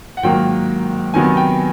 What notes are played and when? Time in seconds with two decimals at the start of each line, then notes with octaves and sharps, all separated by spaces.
0.17 F#5
0.23 G#2 D#3 F#3 A#3 G5
1.14 C3 D#3 F#3 B3 G#5
1.37 G5